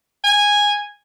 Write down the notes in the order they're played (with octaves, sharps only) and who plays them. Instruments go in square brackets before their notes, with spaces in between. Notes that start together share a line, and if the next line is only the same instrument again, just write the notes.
[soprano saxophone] G#5